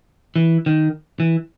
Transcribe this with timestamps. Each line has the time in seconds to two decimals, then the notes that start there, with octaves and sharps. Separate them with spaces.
0.36 E3
0.66 D#3
1.20 E3